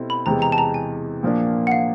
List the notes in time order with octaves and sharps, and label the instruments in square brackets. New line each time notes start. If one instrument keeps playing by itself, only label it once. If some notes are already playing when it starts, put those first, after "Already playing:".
Already playing: [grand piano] B2 G3 C4 E4 A4
[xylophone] B5
[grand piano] E2 C3 E3 G#3 [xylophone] A#5
[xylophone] A#5
A5
A#5
G#5
[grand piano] A#2 F3 A#3 D4
[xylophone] F#5
F5